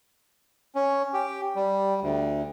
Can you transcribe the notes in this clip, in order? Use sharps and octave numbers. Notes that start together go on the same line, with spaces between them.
C#4
G4
G3
D2